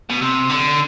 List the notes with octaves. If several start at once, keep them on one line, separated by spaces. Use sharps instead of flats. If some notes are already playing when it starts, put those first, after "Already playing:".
B2
C3
D3